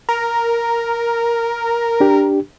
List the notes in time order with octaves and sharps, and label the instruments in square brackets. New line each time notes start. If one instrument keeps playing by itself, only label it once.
[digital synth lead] A#4
[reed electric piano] D4 G4